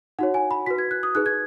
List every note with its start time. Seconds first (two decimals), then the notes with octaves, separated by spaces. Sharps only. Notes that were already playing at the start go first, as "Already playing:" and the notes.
0.19 D#4 F#4 C#5 F#5
0.34 G#5
0.51 B5
0.66 F#4 B4 B6
0.78 G#6
0.91 F#6
1.03 D#6
1.15 D#4 G#4 B4 F#6
1.26 G#6